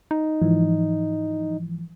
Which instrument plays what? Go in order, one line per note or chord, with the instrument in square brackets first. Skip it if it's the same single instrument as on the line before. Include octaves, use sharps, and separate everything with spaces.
[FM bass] D#4
[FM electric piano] G#2 E3 F3